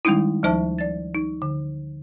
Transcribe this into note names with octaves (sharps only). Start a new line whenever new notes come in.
D#3 G3 G#3 C#4 D#4 E4
D2 F3 D#4 C5 E5 A5
D5 A6
D#4
D3